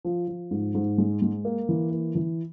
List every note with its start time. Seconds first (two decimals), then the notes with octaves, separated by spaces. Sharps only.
0.05 F3
0.28 F3
0.51 G#2
0.75 G#2
0.98 G#3
1.22 G#3
1.45 A#3
1.69 E3
1.92 A#3
2.15 E3